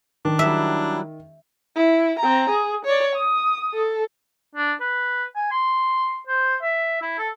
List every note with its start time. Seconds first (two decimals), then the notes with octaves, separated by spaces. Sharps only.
0.25 D#3 D4
0.39 F#3 G3 E4 E5
1.76 E4
2.19 C4 A#5
2.50 G#4
2.85 C#5 D5
3.15 D#6
3.74 A4
4.55 D4
4.81 B4
5.36 G#5
5.51 C6
6.27 C5
6.62 E5
7.02 E4
7.18 A4